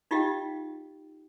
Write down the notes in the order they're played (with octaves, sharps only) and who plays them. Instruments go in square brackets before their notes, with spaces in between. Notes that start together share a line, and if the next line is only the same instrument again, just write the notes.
[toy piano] D#4 F4 G4 D#5 F5 G5